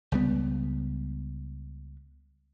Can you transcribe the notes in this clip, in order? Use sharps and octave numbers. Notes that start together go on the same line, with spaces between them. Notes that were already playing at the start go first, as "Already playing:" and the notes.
C#2 G3 B3